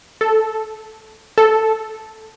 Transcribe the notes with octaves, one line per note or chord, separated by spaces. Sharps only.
A4
A4